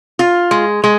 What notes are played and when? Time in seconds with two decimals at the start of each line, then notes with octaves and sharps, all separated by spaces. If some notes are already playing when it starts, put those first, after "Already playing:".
0.19 F4
0.51 G#3
0.84 G#3